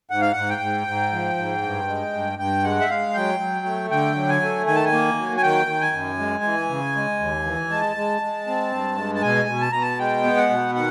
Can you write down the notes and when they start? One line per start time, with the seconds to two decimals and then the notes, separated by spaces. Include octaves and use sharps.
0.10 G#2 F#5
0.21 F5
0.32 G#2 F#5
0.49 G5
0.61 G#2
0.87 G#2
1.12 F3
1.38 G#2
1.62 G2
1.88 G#3
2.13 G2
2.39 G2 G5
2.63 G#3 F#5
2.81 E5
2.90 G#3 F5
3.14 F#3 G5
3.40 F#3
3.66 A3
3.90 D3 G5
4.16 F#3
4.29 G#5
4.42 A3
4.66 D#3 G#5
4.75 A5
4.86 G#5
4.92 A#3
5.18 F#3
5.37 G#5
5.43 D#3 G5
5.67 D#3
5.81 G#5
5.93 F#2
6.19 G#3
6.44 E3
6.70 C#3
6.95 G#3
7.19 D#2
7.45 E3
7.70 G#3 A5
7.97 G#3
8.22 G#3
8.47 C4
8.72 G2
8.97 G#3
9.15 A5
9.22 B2 G#5
9.48 B2
9.61 A5
9.72 B2 A#5
9.82 A5
9.99 G#3 G5
10.24 B3
10.37 F#5
10.50 B2
10.75 D#3 F#5